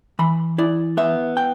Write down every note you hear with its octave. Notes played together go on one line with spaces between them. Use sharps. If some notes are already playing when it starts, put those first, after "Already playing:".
E3 B5
E4 D5
B3 E5
G5